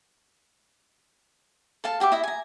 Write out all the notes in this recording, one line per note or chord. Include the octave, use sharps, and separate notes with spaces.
A4 F5 A5
F#4 G4 E5 D6
E4 D#5 E5
G#5 A#5